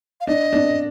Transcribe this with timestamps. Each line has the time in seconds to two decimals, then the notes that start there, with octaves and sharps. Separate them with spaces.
0.21 F5
0.27 D4 D#5
0.53 D4